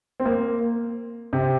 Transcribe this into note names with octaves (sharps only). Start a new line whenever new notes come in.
C4
A#3
C3